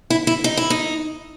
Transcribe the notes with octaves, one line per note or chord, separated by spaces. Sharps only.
E4
E4
D#4
E4
D#4